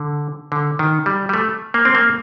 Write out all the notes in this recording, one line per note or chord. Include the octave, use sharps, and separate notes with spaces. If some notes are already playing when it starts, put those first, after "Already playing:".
Already playing: D3
D3
D#3
G3
G3
A3
A#3
C4
A#3